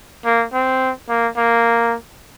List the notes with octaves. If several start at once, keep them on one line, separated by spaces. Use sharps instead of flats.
A#3
C4
A#3
A#3